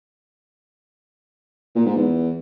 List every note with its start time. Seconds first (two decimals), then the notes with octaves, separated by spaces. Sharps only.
1.75 A#2
1.86 G#2
1.96 E2